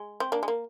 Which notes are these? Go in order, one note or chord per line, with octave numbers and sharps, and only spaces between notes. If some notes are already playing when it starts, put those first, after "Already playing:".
Already playing: G#3
C4
A#3 D4
G#3
A#3